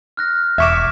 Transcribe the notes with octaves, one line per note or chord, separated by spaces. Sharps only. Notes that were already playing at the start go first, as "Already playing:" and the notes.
F6 F#6 A#6
E1 E5 C#6 D6 G#6 B6 E7